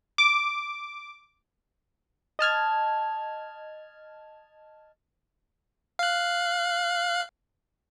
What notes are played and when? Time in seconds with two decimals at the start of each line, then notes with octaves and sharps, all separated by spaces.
0.18 D6
2.39 D#5 A5 F6 G#6
5.99 F5 F#6